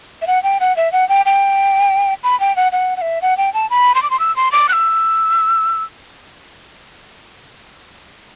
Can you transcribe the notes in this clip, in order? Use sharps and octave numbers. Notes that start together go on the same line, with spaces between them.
E5
F#5
G5
F#5
E5
F#5
G5
G5
B5
G5
F#5
F#5
F#5
E5
F#5
G5
A5
B5
C6
D6
C6
E6
C6
D6
F#6
E6